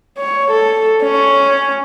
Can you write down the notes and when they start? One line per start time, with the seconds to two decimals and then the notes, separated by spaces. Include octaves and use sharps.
0.18 C#5
0.51 A4
1.03 C#4